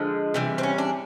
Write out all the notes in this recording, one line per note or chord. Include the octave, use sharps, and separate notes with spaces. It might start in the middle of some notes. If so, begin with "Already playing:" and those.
Already playing: D3 F3 G#3
C3 E3 G3
C4
C#4
D4